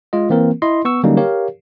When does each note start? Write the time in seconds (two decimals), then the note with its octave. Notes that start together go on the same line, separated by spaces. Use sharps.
0.13 G#3 F4 D#5
0.30 E3 A#3 C4 A#4
0.62 E4 D#5 C6
0.85 B3 C#6 E6
1.04 D3 F#3 G3 A#3 C#4 D#4
1.17 G4 A#4 C#5 F5